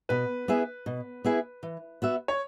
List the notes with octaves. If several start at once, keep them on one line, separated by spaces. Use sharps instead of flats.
B2 B4
B3 E4 G#4 E5
B2
B3 E4 G#4 E5
E3
B3 F#4 E5
C#5